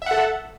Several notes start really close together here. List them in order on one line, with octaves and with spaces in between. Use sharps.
E5 F#5 A4